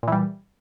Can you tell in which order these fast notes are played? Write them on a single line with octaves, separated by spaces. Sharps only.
A#2 E3 G3